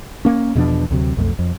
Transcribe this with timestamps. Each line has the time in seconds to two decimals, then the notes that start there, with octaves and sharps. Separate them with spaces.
0.25 A#3 C#4
0.55 E2 B2 F3 D4
0.91 D2 C3 F#3
1.17 B1 F2 A3
1.39 F2